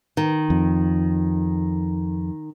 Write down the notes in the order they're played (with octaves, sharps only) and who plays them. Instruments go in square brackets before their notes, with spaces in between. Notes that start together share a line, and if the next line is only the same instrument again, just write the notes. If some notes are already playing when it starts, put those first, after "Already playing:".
[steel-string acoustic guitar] D#3
[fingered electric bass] F2